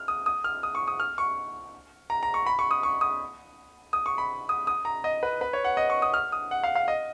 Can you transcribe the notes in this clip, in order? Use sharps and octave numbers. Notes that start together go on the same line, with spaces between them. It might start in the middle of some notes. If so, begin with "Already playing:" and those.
Already playing: F6
D#6
D#6
F6
D#6
C#6
D#6
F6
C#6
A#5
A#5
C#6
B5
C#6
D#6
C#6
D#6
D#6
C#6
B5
D#6
D#6
A#5
D#5
B4
B4
C#5
F#5
D#5
C#6
D#6
F6
D#6
F#5
F5
F5
D#5